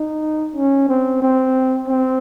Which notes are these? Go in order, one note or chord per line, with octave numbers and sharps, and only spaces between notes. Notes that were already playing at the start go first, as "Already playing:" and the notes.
Already playing: D#4
C#4
C4
C4
C4